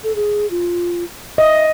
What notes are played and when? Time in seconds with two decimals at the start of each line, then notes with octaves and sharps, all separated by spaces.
0.04 A4
0.16 G#4
0.51 F4
1.38 D#5 E5